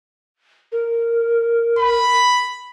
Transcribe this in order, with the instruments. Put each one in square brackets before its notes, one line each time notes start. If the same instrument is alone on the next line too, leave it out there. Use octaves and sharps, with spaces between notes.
[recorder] A#4
[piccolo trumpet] B5